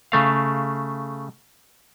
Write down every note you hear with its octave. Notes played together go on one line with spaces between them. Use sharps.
C#3 A3 F5